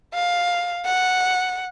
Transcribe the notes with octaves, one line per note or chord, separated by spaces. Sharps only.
F5
F#5